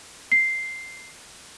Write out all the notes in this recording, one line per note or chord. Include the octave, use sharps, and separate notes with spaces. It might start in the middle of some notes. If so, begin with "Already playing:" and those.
C7